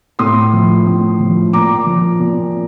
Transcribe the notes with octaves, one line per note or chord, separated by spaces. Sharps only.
A2 C6 D#6
F3
A2
F3
A#2 A#5 D6
F3
A#2